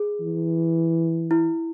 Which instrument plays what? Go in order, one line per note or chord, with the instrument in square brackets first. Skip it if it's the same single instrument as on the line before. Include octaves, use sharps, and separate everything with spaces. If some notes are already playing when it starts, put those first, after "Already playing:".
Already playing: [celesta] G#4
[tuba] E3
[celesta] E4